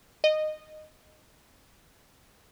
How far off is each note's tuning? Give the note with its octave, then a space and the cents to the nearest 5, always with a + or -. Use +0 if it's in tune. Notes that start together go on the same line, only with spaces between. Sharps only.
D#5 -15